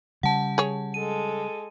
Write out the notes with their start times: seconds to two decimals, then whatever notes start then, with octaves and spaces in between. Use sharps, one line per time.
0.23 C#3 G3 F#5 A5
0.58 G#4 C#5
0.94 G#3 A4 D#7